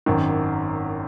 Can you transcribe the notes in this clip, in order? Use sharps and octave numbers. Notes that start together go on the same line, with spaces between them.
G#1 F#2 D#3